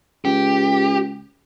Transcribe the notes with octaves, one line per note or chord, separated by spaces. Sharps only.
C#2 G4